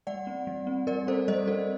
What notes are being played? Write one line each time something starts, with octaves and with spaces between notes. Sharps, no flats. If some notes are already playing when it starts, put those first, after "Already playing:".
G3 D5 F#5
C4
G3
C4
G3 A#4 D5
C4 A4 C5
G3 C5 D#5
C4 A4